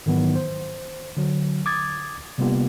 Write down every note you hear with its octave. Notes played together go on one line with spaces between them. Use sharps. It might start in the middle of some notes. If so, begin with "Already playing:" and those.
G#2 D#3 E3 F#3 B3
C5
D3 F#3
D6 D#6 G#6 A6
C3 G3 A#3 B3 F4 G4